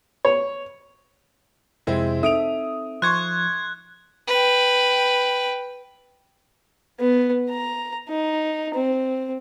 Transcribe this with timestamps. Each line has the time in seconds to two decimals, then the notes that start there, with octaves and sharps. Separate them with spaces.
0.25 C#5
1.87 F2 C3 G#3 C4 E4
2.23 C4 D#4 A4 E5 D#6 D7 F7
3.02 F3 C6 C#6 F#6 G#6
4.28 B4 G5
7.00 B3
7.50 A#5
8.09 D#4
8.74 C4